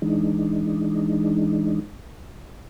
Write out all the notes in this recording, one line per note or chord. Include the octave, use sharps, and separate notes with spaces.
E3 G#3 D4 D#4